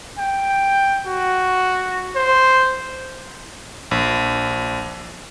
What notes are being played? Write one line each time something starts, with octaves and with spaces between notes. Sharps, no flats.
G5
F#4
C5
A#1